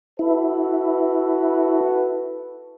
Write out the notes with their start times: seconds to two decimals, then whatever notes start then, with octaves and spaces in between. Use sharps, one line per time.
0.19 E4 F#4 A4 B4